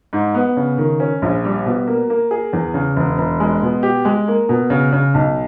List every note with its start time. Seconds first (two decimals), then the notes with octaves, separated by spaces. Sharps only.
0.13 G#2
0.34 B3
0.57 C#3
0.78 D#3
1.00 C#4
1.22 A#1
1.45 G3
1.66 B2
1.87 A#3
2.10 A#3
2.31 G#4
2.53 E2
2.74 C#3
2.96 E1
3.18 E1
3.40 G#3
3.62 B2
3.83 G4
4.05 G#3
4.28 A#3
4.49 B2
4.70 C#3
4.92 C#3
5.14 B1